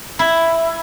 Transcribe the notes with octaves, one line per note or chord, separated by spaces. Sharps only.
E4